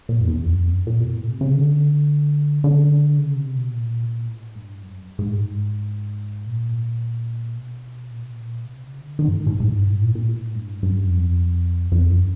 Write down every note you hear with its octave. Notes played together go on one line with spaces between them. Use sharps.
A#2
F2
E2
F2
F#2
F2
F#2
A#2
B2
A2
C3
C#3
D3
D3
C#3
C3
B2
A#2
A2
G2
F#2
G#2
A2
G#2
A#2
B2
A#2
B2
A#2
C3
C#3
D3
D#3
G2
G#2
A2
G#2
G2
A2
A#2
A#2
A2
G2
G2
F#2
F2
F2
F#2